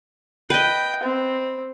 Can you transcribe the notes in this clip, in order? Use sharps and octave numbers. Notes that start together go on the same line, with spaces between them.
B4 D#5 G5
C4